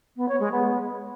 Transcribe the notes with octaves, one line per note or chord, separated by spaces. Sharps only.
B3
C#5
G#3
B3